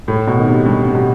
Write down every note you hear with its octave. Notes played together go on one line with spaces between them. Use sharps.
A2
B2
D#3
C3
G2
C3
B2